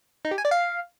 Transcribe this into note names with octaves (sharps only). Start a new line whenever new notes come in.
D#4
G4
G#5
D5
F5